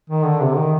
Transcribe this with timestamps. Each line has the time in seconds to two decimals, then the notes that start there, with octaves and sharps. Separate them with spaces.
0.10 D#3
0.25 D3
0.41 C3
0.56 D#3